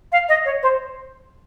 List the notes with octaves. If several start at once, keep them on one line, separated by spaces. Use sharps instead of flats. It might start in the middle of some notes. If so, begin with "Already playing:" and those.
F5
D#5
C#5
C5